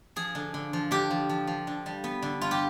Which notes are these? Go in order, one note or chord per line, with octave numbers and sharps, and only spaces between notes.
F3 G#4
D3
D3
F3
D3 G4
F3
F3
F3
D3
G3
B3
D3
G2 F4
G4